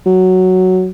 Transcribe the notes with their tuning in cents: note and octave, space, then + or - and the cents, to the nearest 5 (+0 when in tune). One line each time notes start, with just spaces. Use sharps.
F#3 +0